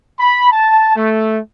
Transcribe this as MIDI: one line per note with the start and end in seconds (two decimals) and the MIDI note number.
0.20 0.50 83
0.52 0.93 81
0.95 1.38 57